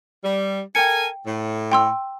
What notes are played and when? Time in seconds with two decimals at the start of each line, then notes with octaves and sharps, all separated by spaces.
0.24 G3
0.75 A4 A#4 G5 G#5 C#7
1.26 A2
1.72 G5 C6 E6